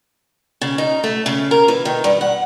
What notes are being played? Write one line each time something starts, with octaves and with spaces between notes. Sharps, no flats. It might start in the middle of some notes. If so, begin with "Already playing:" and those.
C#3
D#4
A3
C#3
A#4
E3
D#3
G2
F#5